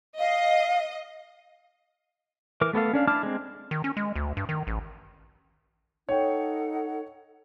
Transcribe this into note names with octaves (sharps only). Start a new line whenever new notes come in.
D#5 F5
E3 A#4 D6
A3 B3 A4 F5
C#4 D4 F5
D4 E4 A5 D6 F6
G#3 C4
D#3
C#4
G#3
D2
G2
D#3
A1
D#4 A4 C#5 F#5 G5